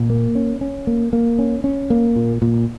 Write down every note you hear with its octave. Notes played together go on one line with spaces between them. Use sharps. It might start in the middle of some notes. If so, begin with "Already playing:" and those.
Already playing: A#2
A#3
C#4
C#4
A#3
A#3
C#4
C#4
A#3
A#2
A#2